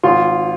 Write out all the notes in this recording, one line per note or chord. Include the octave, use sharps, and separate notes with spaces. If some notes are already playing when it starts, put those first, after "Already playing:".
G#1 F4